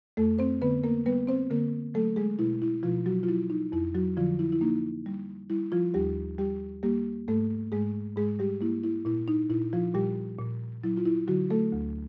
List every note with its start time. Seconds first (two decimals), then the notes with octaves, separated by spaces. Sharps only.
0.17 F2 A3 A4
0.39 C4 C5
0.62 D3 B3 B4
0.84 A#3 A#4
1.06 G3 B3 B4
1.27 C4 C5
1.50 D3 A#3 A#4
1.94 F#3 A3 A4
2.16 G#3 G#4
2.39 B2 E4
2.62 E4
2.83 B2 F3 F4
3.06 F#3 F#4
3.23 F4
3.28 F#3 E4
3.50 D#4
3.72 F2 E4
3.95 F#3 F#4
4.17 D3 F3 F4
4.39 E4
4.52 E4
4.61 A#3 D#4
5.06 G3
5.50 G3 E4
5.72 F3 F4
5.94 D#2 G3 G4
6.39 G3 G4
6.83 G3 A#3 G4
7.28 G#2 A3 A4
7.72 G#2 G#3 G#4
8.16 G#2 G#3 G#4
8.39 G3 G4
8.61 A#3 E4
8.84 E4
9.05 A#2 E4
9.28 D#4
9.50 A#2 E4
9.73 F3 F4
9.94 A#2 G3 G4
10.38 A#2
10.84 F#3 E4
10.97 F4
11.06 E4
11.27 D3 F#3 F#4
11.50 A3 A4
11.72 D2